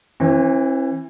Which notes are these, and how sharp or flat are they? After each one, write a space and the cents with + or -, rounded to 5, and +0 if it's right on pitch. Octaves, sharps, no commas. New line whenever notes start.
E3 +0 C4 +45